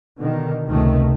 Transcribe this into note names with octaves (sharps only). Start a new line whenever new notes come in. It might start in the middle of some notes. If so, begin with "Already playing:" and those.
B2 D3 D#3
F1 C#2 C3 D#3 A3